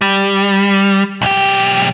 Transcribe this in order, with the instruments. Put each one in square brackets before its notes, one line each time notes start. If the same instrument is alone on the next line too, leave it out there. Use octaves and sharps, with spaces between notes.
[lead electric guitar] G3
B1 G4